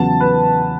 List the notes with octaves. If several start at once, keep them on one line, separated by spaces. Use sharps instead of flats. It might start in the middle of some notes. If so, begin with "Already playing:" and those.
Already playing: E2 C#3 F#3 B3 A5
B4